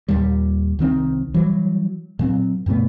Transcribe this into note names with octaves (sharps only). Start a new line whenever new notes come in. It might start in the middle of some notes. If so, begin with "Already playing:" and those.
D#2 A#2 G3
C2 D#3 C4
E3 F#3 G3
A#2 F#3 C4
G2 B2 A3 B3